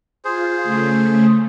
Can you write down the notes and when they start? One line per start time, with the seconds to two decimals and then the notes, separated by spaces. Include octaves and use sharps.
0.25 F4 G#4 C5
0.63 C#3 A3